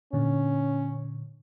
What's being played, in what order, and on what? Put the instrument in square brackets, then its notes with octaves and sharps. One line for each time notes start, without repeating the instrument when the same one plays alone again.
[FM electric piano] A#2 D3 [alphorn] C#4